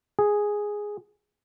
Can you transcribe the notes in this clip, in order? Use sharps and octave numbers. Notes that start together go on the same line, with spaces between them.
G#4